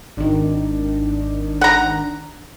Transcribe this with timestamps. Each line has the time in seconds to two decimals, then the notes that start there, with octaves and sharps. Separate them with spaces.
0.17 G#1 D#3 D4
1.61 F#5 A#5